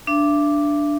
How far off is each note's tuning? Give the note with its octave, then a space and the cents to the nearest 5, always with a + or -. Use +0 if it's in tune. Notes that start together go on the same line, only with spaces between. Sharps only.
D4 +0 E5 +40